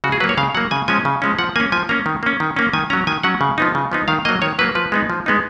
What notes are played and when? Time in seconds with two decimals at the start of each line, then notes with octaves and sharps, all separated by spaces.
0.04 C#3 F#4
0.12 G#4
0.20 F#3 B4
0.24 A#3
0.29 C#5
0.37 C#3 F5
0.54 F#3 A#3 F#5
0.71 C#3 G#5
0.88 F3 G#3 C#4 G#5
1.05 C#3
1.22 F3 G#3 C#4
1.39 F3 F#5
1.56 A#3 C#4 G#5
1.72 F3 G#5
1.89 A#3 C#4 A#5
2.06 D#3
2.23 A#3 C#4
2.40 D#3
2.56 A#3 C#4
2.73 D#3 G#5
2.90 F#3 C#4 A#5
3.07 D#3 G#5
3.23 F#3 C#4 F#5
3.41 C#3
3.58 F3 B3 D#4
3.75 C#3
3.92 F3 B3 D#4
4.08 D#3 F5
4.25 F#3 A#3 D#5
4.42 D#3 C#5
4.59 F#3 A#3 B4
4.75 F3 B4
4.92 G#3 B3 D#4
5.10 F3
5.26 G#3 B3 D#4